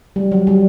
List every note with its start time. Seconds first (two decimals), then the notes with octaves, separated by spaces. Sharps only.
0.16 G3
0.32 F#3
0.47 G3